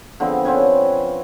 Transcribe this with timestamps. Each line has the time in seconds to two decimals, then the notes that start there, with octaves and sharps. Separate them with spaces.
0.20 D3 F3 B3 C4
0.45 C4 C#4 B4 G#5